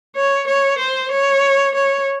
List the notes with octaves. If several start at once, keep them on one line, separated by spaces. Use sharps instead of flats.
C#5
C#5
C5
C#5
C#5